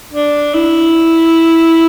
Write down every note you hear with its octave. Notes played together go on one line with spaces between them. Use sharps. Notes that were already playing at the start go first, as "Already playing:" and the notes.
D4
E4